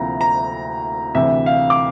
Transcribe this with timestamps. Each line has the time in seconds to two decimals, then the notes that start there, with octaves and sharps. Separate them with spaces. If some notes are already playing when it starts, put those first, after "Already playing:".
Already playing: D2 C3 F3 A#3 E4 A#5
0.21 A#5
1.14 D2 C3 E3 E5
1.46 F5
1.70 D6